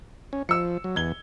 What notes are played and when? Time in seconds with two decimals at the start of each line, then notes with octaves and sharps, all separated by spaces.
0.33 C#4
0.49 F3 E6 C#7
0.84 F#3
0.96 E2 G#6 G7